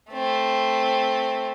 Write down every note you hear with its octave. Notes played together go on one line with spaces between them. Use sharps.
A3 C4